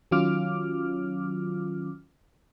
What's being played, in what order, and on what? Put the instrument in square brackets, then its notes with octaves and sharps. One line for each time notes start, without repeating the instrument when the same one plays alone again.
[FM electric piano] D#3 F#3 C#4 F4 D6 F6